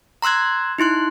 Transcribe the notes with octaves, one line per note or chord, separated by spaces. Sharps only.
A#5 C6 E6 F#6 G#6
D#4 E4 C6 F#6